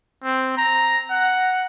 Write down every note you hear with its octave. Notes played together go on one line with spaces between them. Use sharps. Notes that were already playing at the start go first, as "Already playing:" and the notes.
C4
A#5
F#5